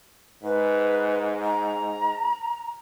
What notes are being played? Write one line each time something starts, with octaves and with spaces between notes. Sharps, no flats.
G#2 B4
A#5